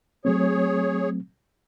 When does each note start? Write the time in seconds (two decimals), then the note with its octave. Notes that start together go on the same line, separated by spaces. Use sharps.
0.25 F#3 A3 C4 G#4 C#5